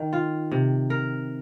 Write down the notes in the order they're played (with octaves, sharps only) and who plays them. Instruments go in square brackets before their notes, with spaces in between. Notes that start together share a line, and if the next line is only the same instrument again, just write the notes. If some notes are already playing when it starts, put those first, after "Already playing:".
Already playing: [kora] D#3
F4
C3
A#4